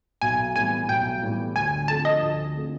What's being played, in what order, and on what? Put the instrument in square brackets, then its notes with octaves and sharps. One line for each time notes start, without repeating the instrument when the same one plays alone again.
[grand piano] B1 [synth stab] G#5
[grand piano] A2 E3 G3 B3 [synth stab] G#5
[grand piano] B1 [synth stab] G5
[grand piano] A2 E3 G3 B3
[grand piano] D2 [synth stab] G#5
[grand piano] D3 F3 A3 C4 [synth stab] A5
[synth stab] D#5
[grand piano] D2
D3 F3 A3 C4